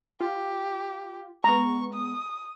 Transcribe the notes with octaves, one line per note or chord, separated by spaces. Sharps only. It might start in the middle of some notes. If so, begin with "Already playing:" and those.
F4 G4
G#3 B3 A#5 C#6
D#6